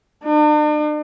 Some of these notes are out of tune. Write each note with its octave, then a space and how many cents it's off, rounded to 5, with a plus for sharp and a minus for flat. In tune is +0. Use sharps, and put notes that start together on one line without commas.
D4 +45